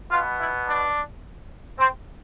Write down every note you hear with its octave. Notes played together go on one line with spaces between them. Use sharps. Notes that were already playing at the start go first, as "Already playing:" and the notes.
B2 B3 F4
E4
D4
C4